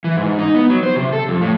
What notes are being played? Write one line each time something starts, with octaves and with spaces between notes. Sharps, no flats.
E3
G#2
D#4
B3
F#3
C5
C3
A4
F2
A2